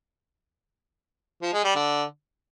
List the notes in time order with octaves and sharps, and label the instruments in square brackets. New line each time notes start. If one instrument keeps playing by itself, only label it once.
[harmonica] F3
G#3
G3
D3